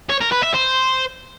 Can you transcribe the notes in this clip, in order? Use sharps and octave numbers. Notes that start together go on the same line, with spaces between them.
C#5
A#4
B4
E5
C5